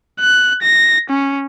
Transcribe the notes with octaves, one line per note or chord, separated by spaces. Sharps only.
F#6
A#6
C#4